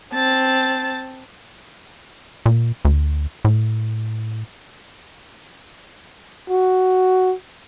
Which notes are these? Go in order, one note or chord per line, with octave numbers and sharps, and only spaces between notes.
C4 A5 A6
A#2
D2
A2
F#4